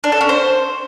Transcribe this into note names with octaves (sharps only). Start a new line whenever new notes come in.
D4
A4
C#4
C5